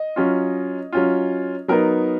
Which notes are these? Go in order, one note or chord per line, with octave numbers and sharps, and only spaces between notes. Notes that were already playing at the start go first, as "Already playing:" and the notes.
Already playing: D#5
F#3 C#4 F4
F#3 C#4 F4
F#3 B3 D#4 A#4